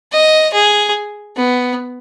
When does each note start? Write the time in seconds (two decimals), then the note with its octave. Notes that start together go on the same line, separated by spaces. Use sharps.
0.12 D#5
0.53 G#4
1.36 B3